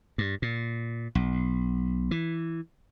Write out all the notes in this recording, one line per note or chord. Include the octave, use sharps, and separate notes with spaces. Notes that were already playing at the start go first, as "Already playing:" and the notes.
G2
A#2
B1
E3